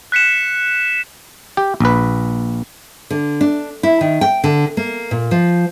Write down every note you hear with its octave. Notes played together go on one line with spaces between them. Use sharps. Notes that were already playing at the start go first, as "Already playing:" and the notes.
F#6 B6 C#7 E7
G4
A#1 B4
D3
D4
E4
D#3
G5
D3
A#3
A#2
F3